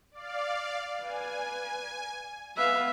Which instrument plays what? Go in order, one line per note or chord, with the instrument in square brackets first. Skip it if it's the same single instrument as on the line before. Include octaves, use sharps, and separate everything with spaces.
[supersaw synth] D5 F5
[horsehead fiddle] B4 [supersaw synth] G#5
[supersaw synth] B3 [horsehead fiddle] B4 F5 [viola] E5